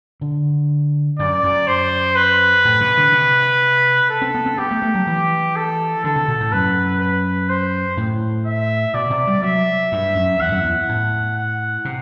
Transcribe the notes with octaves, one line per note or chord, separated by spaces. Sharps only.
D3
F#2 D5
F#2
C5
B4
A2
C3
D3
C3
A4
C4
B3
C4
B3 G4
A3
A3
F#3
E3
A4
D3 A4
C3
B2
A2
F#2 B4
B4
C5
A2
E5
B2 D5
C3
G3
F#3 E5
G2
F#2
E2 F#5
F#2
E2
A2
F#5
C3